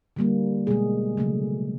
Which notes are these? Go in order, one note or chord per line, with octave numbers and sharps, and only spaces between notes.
D3 G3 A#3
B2 G#3 G#4
C#3 F#3 A3